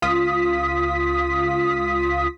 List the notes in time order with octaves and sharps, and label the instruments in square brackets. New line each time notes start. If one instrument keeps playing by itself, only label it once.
[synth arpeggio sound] C#2 F4 D#6 B6